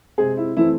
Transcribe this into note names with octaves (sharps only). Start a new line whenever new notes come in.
C3 G#3 C4 G#4
E4
E3 A3 C4 E4